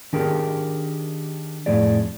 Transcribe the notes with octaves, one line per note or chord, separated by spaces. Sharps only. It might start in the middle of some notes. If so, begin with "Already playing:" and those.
D#3 D4 G4 G#4 A#4
F2 A2 G#4 D5